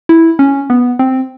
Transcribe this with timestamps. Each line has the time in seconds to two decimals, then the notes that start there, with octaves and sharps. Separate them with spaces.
0.09 E4
0.39 C#4
0.70 B3
0.99 C4